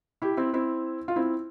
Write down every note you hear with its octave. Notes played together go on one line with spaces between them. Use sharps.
E4 G4
C4 E4
C4 E4
F4
C4 E4